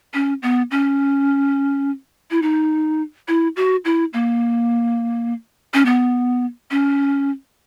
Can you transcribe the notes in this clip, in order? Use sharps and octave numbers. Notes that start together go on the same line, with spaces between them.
C#4
B3
C#4
E4
D#4
E4
F#4
E4
A#3
C#4
B3
C#4